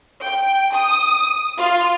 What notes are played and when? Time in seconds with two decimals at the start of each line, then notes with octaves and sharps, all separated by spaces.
0.25 G5
0.75 D#6
1.57 F4